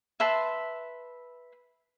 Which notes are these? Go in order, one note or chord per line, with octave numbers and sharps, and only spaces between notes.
B4 E5 A5 C6